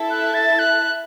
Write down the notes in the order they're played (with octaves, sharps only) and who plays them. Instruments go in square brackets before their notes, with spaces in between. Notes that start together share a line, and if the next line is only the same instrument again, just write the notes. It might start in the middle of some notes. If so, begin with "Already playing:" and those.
Already playing: [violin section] E4 A4 E5 A5
[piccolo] F#6
A6
F#6